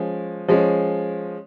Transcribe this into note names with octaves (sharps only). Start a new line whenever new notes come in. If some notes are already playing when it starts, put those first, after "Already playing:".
Already playing: F3 G#3 C#4
F3 G#3 C#4